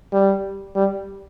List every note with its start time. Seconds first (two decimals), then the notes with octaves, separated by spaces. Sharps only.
0.13 G3
0.76 G3